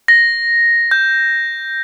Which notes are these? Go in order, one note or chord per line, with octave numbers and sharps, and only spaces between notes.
A#6
G6